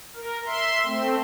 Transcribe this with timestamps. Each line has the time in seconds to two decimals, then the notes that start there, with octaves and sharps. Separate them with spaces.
0.15 A#4
0.46 E5 C6
0.85 A3 C4